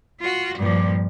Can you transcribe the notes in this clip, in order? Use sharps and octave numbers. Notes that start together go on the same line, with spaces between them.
F4 F#4
G2 A#2 F3